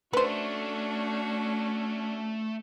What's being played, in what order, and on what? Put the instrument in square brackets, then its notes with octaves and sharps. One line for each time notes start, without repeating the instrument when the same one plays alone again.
[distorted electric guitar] A3 [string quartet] C#4 D4 F#4 [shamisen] B4 C5